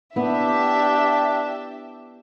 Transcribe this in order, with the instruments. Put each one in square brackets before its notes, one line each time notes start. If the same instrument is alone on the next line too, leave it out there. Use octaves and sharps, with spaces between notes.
[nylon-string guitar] B3 E4 [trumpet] D4 [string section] G4 E5